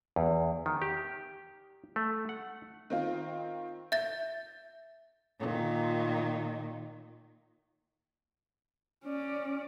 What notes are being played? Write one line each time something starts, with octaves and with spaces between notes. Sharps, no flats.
E2
D#3
G4
A3
F#5
D#3 C4 F4
E5 G6 A6
A#2 D#3
C#4 D5